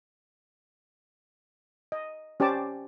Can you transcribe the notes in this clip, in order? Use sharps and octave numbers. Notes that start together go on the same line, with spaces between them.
D#5
C#4 G4 C5 D5 A5 D6